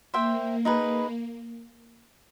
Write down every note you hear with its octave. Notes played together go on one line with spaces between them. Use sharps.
A#3 C5 E5 G5
A#3 D#4 G#4 B4